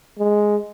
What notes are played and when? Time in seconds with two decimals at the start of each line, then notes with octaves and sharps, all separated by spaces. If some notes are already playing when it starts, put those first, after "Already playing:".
0.19 G#3